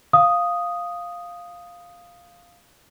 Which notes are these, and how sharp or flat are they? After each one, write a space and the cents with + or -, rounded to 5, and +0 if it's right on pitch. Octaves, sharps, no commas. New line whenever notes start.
F5 +0 D#6 +0